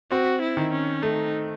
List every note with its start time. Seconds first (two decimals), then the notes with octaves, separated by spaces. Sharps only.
0.11 C4 F#4
0.42 E4
0.57 D#3
0.73 C#4
1.03 A3 D#4